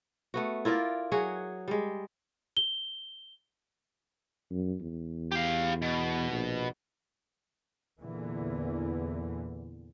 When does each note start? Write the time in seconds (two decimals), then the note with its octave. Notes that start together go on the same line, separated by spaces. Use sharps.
0.34 A3 B3 F#4
0.65 E4 F4 A#4 D5
1.12 F#3 F#4 G#4
1.68 G3 G#3
2.57 G7
4.51 F#2
4.81 E2
5.32 G4 F5
5.82 B2
6.31 A#1
7.99 E2 A#2 D3 E3